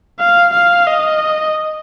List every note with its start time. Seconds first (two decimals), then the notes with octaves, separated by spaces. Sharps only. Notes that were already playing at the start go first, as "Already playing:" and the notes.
0.20 F5
0.54 F5
0.87 D#5